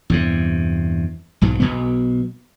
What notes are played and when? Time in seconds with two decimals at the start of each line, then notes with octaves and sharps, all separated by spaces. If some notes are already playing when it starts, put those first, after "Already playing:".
0.10 E2 G2 C3
1.41 B1 G#2 F#3
1.60 B1 B2 B3